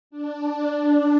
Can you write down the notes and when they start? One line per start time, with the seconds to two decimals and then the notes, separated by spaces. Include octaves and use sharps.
0.10 D4